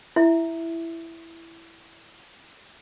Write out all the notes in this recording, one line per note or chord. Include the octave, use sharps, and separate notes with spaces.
E4 E5